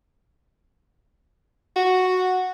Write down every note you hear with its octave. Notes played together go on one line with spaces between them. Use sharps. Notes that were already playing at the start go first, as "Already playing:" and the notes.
F#4